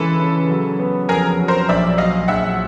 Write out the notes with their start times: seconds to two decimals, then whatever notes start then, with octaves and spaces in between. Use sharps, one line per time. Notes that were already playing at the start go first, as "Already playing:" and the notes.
Already playing: C#3 E3 G#3 A4 B4
0.20 C#3
0.49 F#3
0.79 B3
1.09 F2 G#4 A#4
1.39 F#3
1.48 A#4 C5
1.69 A#1 D5 E5
1.98 F#3 D#5 F5
2.28 A#1 E5 F#5